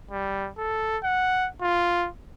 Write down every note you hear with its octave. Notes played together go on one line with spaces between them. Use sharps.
G3
A4
F#5
F4